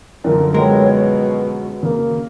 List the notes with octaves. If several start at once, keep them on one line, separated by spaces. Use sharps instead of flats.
F#2 D3 F3 A#4
B2 G#3 A4 A#4 C#5 G5
F#4
C#3 A#3